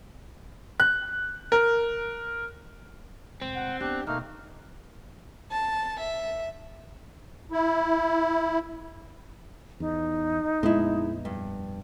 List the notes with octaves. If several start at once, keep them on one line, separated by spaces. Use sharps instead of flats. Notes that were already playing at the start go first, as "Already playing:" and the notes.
F#6
A#4
E1 D2 C4
F#5
B3 D4 G4 F#6
B1 A3 A#3 D#4 F6
A5
E5
E4
E2 D#4
F2 A#2 G#3 B3 E4
G2